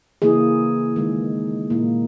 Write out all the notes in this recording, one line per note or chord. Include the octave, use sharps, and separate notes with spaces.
C#3 E3 A#3 E4 G#4
D#3 G#3 D#4
A#2 A#3 E4